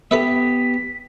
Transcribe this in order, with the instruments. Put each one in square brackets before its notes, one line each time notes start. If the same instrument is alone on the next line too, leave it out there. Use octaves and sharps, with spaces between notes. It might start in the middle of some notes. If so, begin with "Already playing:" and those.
[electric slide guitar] B3 G4 [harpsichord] A4 B4 E5 [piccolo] B6